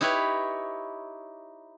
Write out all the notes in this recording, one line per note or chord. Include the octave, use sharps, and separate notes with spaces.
D#4 E4 G4 B4 C#5